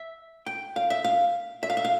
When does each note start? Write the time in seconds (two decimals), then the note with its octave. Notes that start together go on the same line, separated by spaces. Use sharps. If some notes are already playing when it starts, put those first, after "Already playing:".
Already playing: E5
0.46 G5
0.76 F5
0.90 E5
1.04 F5
1.63 E5
1.70 F5
1.77 E5
1.84 F5